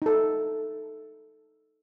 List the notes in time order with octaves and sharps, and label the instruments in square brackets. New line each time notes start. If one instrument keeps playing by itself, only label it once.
[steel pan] D#4 A4